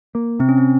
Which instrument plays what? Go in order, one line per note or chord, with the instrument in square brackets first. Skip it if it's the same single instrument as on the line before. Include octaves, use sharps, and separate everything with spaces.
[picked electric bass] A#3
[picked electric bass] C3 [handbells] C4
[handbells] C#4
C4